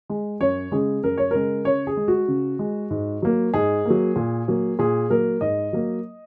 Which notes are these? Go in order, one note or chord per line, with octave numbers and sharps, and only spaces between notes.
G#3
F#2 C#5
C#3 G#3 G#4
F#2 A#4
C#5
C#3 G#3 A#4
C#3 C#5
G#4
G#3
F#4
C#3
G#3
G#2
F#3 A#3
G#2 G#4
F#3 A#3
A#2
F#3 A#3
A#2 G#4
F#3 A#3 A#4
G#2 D#5
F#3 A#3